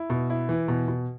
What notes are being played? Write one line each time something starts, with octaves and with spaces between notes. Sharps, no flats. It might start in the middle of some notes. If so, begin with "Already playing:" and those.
Already playing: E4
B2
E4
E3
B2
B2